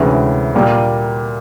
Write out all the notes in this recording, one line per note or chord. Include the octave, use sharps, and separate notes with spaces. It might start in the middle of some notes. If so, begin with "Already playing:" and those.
Already playing: D2 C3 E3 G#3 C#4
A#2 G3 A#3